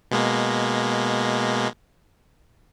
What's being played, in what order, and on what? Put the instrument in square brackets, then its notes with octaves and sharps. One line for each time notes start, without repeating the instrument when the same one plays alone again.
[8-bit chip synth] B2 G#3 A#3